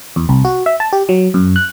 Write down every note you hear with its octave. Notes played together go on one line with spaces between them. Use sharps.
E2
C2
F#4
E5
A5
G4
F#3
F#2
F#6